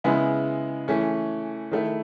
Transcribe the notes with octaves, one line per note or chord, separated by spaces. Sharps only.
C#3 G#3 B3 E4
E3 A3 C#4
D#3 A3 E4